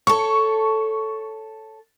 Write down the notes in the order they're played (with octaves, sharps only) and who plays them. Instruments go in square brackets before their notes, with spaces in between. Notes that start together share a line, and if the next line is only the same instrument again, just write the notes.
[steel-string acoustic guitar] A4 C#5 [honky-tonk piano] C#6